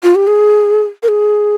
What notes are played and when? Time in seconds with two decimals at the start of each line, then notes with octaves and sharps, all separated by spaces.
0.03 F4
0.15 G4
0.27 G#4
1.03 A#4
1.08 G#4